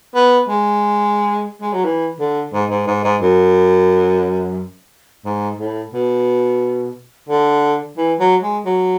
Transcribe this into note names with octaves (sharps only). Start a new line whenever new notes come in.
B3
G#3
G#3
F#3
E3
D3
G#2
G#2
G#2
G#2
F#2
G#2
A2
B2
D3
E3
F#3
G#3
F#3